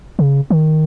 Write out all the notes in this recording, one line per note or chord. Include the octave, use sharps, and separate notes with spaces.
C#3
D#3